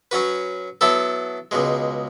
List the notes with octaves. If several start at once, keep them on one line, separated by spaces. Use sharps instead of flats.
F#3 C#4 F#4 B4
F#3 B3 E4 A4
C#2 B2 G#3